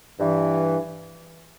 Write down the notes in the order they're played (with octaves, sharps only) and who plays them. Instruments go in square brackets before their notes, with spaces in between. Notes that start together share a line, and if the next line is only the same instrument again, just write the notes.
[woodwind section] G2 E3